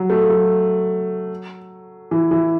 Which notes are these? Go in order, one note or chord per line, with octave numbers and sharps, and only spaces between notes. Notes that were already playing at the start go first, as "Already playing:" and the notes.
Already playing: F#3
A3
F#3
E3
E3